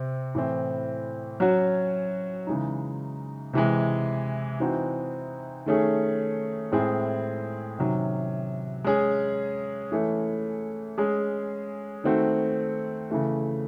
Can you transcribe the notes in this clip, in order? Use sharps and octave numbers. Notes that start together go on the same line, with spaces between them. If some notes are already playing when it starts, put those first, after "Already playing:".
Already playing: C3 C4
A2 E3 C4
F#3 C#4 F#4
C#3 E3 G#3 D#4
C3 E3 G#3
E3 C4 D#4 F#4
D#3 A3 C#4 G#4
A2 G#3 C4 E4 G#4
C3 D#3 F#3 C#4
G#3 C#4 G#4
E3 A3 C#4
G#3 C#4 G#4
D#3 A3 C4 F#4
C#3 E3 A3